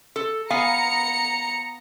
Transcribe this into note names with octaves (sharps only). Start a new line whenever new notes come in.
A4
B3 F5 G#5 A#5 C#7